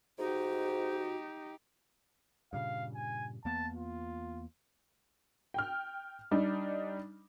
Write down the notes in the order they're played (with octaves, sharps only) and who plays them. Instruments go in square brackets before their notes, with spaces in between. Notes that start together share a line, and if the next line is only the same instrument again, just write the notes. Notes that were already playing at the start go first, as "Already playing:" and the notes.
[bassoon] G#2 [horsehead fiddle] D#4 G4 [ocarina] F#4
[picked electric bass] G2 A#2 C#3 [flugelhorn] F5
[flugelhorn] G#5
[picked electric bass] E2 A#3 B3 [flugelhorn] A5
[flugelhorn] F4
[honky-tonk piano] G5 F6
G3 D4 D#4